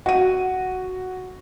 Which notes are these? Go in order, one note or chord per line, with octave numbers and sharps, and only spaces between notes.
F#4 D#7